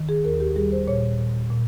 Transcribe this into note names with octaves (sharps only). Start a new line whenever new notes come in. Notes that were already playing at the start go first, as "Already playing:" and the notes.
Already playing: D#3
G#4
D#2 A#4
G4
G3 G#4
C5
A#2 C#5
A#2
A#2